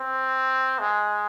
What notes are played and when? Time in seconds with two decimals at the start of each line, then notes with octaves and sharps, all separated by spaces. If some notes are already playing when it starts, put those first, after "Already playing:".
Already playing: C4
0.79 G#3